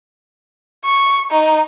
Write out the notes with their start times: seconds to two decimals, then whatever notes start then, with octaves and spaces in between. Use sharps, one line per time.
0.85 C#6
1.31 D#4